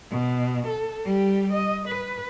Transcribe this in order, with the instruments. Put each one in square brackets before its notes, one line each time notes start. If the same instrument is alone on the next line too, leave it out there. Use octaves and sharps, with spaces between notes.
[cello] B2
A4
G3 G4
D#5
B4